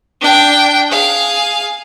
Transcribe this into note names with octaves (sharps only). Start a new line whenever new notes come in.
D4 G5
G#4 F5